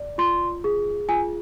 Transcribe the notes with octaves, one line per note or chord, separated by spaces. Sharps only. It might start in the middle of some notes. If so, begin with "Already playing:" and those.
Already playing: D5
F4 C6
G#4
F4 G#5